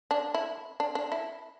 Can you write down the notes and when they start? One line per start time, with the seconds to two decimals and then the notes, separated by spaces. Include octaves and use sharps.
0.11 D4
0.34 E4
0.80 D4
0.95 D4
1.12 E4